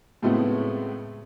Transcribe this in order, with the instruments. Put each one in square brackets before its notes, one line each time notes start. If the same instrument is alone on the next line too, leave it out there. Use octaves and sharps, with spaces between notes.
[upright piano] A2 C#3 G#3 A3 B3 C4